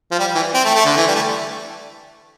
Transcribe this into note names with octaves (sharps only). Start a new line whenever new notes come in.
F3
G3
E3
C4
A3
A3
D3
E3
G3
A3